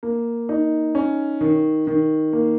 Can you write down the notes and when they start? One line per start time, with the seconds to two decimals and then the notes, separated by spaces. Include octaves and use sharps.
0.03 A#3
0.49 D#4
0.95 C#4
1.41 D#3
1.87 D#3
2.33 A#3